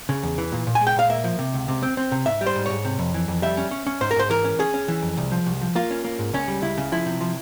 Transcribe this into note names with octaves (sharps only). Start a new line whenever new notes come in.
C#3
E2
E3
A#2
A#2
G#5
G#3
G5
A#2 F5
A#3 E5
F3
C3
C#2
C3
C4
C4
C3
G#2 E5
G3
C5
G#2
G#2 C#5
C3
F2
E3
F2
G3 E5
C#4
C#4
C#4
G#2 C5
A#4
G#2 C5
E3 A#4
C#4
C#4 G#4
C#4
E3
F2
C2
F3
C2
F3
A#3 F4
C#4
A#3
G#2
C#2 C#4
G3
C#2 E4
C#3
F3 E4
C3
F3